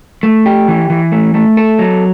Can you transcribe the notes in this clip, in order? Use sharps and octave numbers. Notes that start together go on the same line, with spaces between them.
A3
G4
E3
E3
A3
A3
A4
F#3